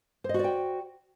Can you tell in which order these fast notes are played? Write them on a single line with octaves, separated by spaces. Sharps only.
C5 D#5 F#4 D5 G5